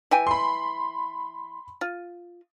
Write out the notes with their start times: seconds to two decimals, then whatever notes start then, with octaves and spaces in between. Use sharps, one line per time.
0.11 E3 G5 G#5
0.27 B5 C6
1.81 F4